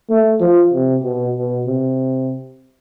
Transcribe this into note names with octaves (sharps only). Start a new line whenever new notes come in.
A3
F3
C3
B2
B2
C3